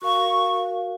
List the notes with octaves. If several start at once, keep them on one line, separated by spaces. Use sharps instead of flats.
F#4 A#4 F5 C#6